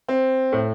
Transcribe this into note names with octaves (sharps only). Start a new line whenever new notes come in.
C4
A2